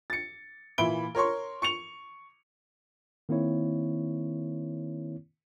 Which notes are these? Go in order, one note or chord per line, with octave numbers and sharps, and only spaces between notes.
A6 C#7
A#2 E3 E5 B5 D7 G7
A#4 C#5 C6 C#6
C#6 C#7 F7
D#3 A#3 C4 E4 C#5